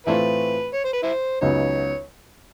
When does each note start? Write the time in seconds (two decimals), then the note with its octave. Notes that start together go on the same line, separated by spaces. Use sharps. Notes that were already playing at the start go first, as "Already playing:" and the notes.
0.07 A2 E3 A3 C4 D4 E4 F4 B4
0.73 C#5
0.84 C5
0.93 B4
1.03 E4 C5
1.41 C#2 C#3 F#3 B3 D#4 C#5